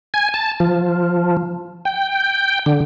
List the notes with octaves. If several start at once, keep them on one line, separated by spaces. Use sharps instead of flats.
G#5
A5
F3
G5
D3